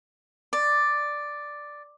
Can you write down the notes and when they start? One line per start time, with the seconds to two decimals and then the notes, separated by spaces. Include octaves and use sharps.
0.53 D5